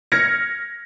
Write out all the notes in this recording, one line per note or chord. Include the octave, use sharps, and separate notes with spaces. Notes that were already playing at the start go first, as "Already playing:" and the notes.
F6 G#6 A#6 C#7